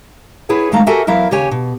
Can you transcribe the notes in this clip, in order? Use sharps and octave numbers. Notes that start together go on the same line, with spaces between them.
E4 G#4 B4 C#5 F#5
F#2 D#3 G#3 A3 F5 A#5
F#4 G4 A4 A#4 E5 G#5
E2 F#3 E4 A#4 E5 F5
D#2 C#3 G4 C#5 G#5
B2